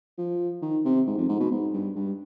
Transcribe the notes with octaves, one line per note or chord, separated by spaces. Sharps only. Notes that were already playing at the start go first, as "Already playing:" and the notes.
F3
D#3
C3
G#2
F2
G#2
B2
G#2
G2
G2